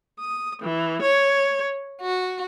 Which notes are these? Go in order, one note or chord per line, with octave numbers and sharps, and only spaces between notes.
D#6
E3
C#5
F#4